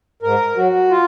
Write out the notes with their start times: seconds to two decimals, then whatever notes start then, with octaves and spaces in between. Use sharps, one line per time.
0.22 G#2 A#4
0.56 F#3 F#4
0.91 F4